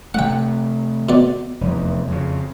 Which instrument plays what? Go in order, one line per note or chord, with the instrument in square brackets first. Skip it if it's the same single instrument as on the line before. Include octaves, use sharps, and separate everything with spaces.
[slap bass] C3 A3 [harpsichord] F#5 G5
[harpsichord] B2 D5
[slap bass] F1 E2
F2 C#3